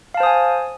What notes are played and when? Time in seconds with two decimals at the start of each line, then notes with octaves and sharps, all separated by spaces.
0.14 F5
0.17 A5
0.20 C5
0.23 D#6
0.26 G#5